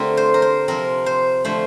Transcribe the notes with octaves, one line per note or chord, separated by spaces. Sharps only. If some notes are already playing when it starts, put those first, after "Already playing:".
Already playing: D3 A3 C4 F4 G4 A#4
C5
A#4
C5
C3 F3 C4 A#4
C5
D3 F3 A3 C5